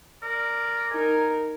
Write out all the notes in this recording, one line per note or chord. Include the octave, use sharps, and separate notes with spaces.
A#4 D5
D#4 A#4 G#5